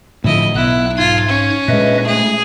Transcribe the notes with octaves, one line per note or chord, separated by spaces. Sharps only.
A2 D3 F3 E4 D#5
B1 B3 E4 F#6
G#2 F4 G#6
C#4
A#2 G#3 B4 D#5 E5
A3 G#4